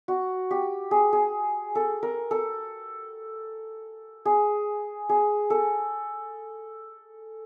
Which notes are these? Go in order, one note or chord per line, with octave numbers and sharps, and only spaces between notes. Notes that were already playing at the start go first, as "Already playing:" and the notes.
F#4
G4
G#4
G#4
A4
A#4
A4
G#4
G#4
A4